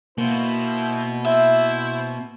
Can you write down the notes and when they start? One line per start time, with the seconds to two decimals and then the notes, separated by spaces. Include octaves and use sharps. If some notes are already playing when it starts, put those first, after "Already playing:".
0.18 B2 A#3 E4 C5
1.24 E4 C5 E5